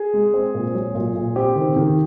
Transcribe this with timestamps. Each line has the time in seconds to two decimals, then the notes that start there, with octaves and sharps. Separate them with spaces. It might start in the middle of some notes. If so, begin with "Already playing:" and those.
Already playing: G#4
0.14 G#3
0.34 C4
0.54 A#2
0.75 F#3
0.95 A#2
1.15 A#2
1.36 C4 G4
1.56 D#3
1.76 D#3